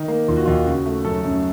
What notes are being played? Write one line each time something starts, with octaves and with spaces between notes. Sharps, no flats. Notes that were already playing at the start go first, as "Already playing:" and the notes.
Already playing: D#3 D#4
A#3
D#2 F4
F#4
D#2 F4
C#3 F#4
A3
F#2 A4
F#2